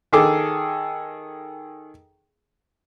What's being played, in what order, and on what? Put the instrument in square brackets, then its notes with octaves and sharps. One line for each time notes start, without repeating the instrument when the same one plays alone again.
[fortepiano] D#3 G#4 A4 D6